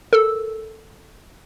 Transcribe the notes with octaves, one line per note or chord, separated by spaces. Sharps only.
A4 A#4 E6